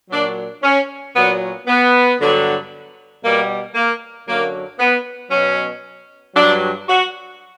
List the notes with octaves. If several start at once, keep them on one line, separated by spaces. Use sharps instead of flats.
A#2 F#3 D4
C#4
A#2 F#3 B3
B3
G2 D3 F#3
B2 G3 A#3
A#3
F#2 D3 F#3 A#3
B3
B2 F#3 C#4
G2 F#3 D4
F#4